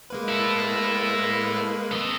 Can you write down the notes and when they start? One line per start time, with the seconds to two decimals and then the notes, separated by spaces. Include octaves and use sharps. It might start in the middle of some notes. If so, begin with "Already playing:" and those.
0.10 G#3 A#3 B4
0.28 E4 A4
1.91 A4 D#5